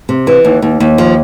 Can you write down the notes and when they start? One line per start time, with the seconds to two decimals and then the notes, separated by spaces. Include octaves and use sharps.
0.09 C3
0.27 E3
0.45 D#2
0.62 D#2
0.80 D#2
0.98 F3